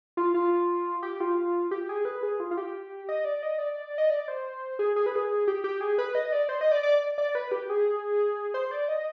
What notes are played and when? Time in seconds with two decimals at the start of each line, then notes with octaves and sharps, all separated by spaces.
0.17 F4
0.34 F4
1.03 G4
1.20 F4
1.71 G4
1.89 G#4
2.05 B4
2.23 G#4
2.40 F4
2.51 F4
2.57 G4
3.09 D#5
3.25 D5
3.43 D#5
3.59 D5
3.98 D#5
4.10 D5
4.28 C5
4.79 G#4
4.96 G#4
5.06 B4
5.16 G#4
5.48 G4
5.64 G4
5.81 G#4
5.98 B4
6.15 D#5
6.33 D5
6.49 C5
6.61 D#5
6.72 D5
6.83 D5
7.18 D5
7.35 B4
7.52 G4
7.69 G#4
8.54 C5
8.71 D5
8.88 D#5